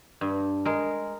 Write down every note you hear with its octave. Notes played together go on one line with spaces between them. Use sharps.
G2
G#3 A#4